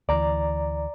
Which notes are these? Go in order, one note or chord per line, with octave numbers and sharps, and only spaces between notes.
D2 E3 D5 A#5